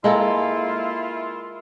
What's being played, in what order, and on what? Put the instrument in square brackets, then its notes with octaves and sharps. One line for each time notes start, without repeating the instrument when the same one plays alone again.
[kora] G#3 A#3 A4 [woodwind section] E4 F4